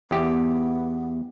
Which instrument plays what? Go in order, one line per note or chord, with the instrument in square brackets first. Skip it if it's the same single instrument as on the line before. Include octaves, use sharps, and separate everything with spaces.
[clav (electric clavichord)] E2 G4 [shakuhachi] B3